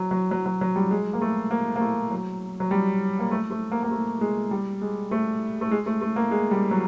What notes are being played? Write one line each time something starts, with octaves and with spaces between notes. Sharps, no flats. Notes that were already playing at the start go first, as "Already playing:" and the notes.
Already playing: F#3
F#3
F#3
F#3
F#3
G3
G#3
A#3
A3
A#3
A#3
A3
F#3
F#3
G3
A#3
A3
A3
A#3
A#3
A3
G#3
G3
G#3
A3
A3
G#3
A3
A3
A#3
G#3
G3
F#3